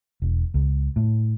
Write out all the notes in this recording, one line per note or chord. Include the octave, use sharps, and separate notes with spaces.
E1
C#2
A2